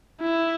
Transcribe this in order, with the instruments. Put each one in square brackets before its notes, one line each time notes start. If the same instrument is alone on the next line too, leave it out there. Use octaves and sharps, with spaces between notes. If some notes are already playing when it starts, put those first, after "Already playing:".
[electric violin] E4